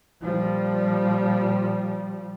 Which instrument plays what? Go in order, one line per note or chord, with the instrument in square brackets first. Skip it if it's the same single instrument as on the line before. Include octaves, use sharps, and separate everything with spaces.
[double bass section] A#2 F3 G3